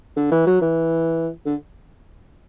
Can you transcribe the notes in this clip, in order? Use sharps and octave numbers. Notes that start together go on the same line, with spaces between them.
D3
E3
F#3
E3
D3